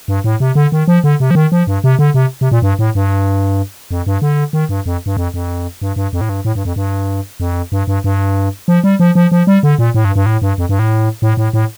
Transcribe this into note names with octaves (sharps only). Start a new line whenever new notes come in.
G2
A2
C3
D3
D#3
F3
D3
C3
F3
D#3
F3
G2
C3
D3
C3
C3
A#2
G2
A2
G2
F2
G2
D3
D#3
G2
F2
G2
F2
F2
G2
G2
F2
A2
G2
A2
G2
F2
G2
F2
G2
G2
G2
F3
G3
F3
F3
F3
G3
D3
A#2
A2
G2
G2
A2
G2
F2
G2
A2
A2
A2
A2